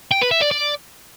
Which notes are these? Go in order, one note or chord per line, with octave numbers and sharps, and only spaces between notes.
G5
B4
E5
D5
D5